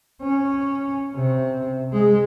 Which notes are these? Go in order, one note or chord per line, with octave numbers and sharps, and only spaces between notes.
C#4
C3
G#3